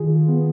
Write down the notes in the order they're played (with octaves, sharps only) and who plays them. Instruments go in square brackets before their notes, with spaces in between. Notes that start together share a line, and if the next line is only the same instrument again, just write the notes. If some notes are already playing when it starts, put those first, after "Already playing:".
Already playing: [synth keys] D#3 F4 G#4
B3